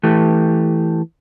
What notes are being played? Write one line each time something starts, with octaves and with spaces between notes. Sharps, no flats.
E3 A3 G4